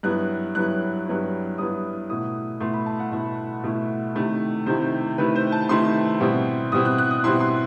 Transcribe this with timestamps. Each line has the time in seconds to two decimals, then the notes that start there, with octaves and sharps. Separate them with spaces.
0.03 G2 F#3 B3 E4 F#6
0.55 G2 F#3 B3 E4 F#6
1.06 G2 F#3 B3 E4
1.58 G2 F#3 B3 E4 D#6
2.09 B2 A3 E4 D#6
2.60 B2 A3 E4 C6
2.74 B5
2.86 A5
3.00 F#5
3.12 B2 A3 E4 E5
3.64 B2 A3 E4
4.15 C3 D#3 A3 E4
4.66 C3 D#3 A3 E4 C5
5.18 C3 D#3 A3 E4 B4
5.36 C5
5.52 A5
5.69 C3 D#3 A3 E4 C6
6.20 B2 G3 C4 E4
6.72 B2 G3 C4 E4 D#6
6.85 F#6
6.98 F#6
7.11 D#6
7.24 B2 G3 C4 E4 C6
7.40 C6